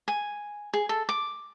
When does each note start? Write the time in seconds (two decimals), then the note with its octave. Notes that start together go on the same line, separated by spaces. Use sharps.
0.08 G#5
0.74 G#4
0.89 A4
1.09 D6